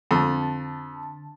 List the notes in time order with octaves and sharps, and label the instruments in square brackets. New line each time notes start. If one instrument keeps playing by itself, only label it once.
[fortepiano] F2 [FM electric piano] D3 A5